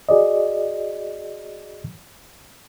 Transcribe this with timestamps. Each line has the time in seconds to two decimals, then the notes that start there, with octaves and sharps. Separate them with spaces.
0.09 F#4 G#4 D5 D#5